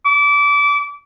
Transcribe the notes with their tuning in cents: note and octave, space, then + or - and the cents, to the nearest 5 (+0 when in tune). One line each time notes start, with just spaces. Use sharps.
D6 -25